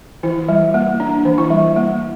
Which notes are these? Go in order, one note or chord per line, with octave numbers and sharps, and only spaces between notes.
E3 E4
G3
A#3
D4
E3
E4
G3
A#3